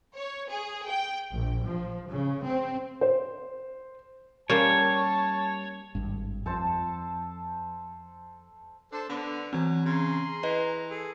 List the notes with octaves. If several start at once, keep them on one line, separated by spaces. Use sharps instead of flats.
C#5
G#4
G5
A#1
F3
C#3
C4
C5
G3 A#3 C#4 C5 C#5 A5
G#1 G2
F2 A4 C5 A5
D4 A4 C5
D3 B3 D4
E3 F#3 C4
C#3 G#4 A#5 C6
E3 B4 D#5
G#4 A4